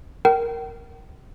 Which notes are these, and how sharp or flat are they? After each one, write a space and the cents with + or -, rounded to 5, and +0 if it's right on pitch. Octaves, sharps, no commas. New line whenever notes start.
A#4 +0 G5 -35